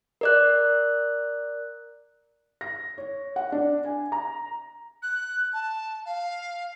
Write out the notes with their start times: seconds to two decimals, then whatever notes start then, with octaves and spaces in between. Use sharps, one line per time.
0.21 A#4 D5 F#6
2.61 A#6
2.98 C#5
3.36 F#5
3.52 D4
3.84 G#5
4.12 A#5
5.03 F#6
5.53 A5
6.06 F5